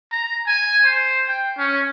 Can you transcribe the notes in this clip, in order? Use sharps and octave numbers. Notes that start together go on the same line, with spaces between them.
A#5
G#5
C5
G5
C#4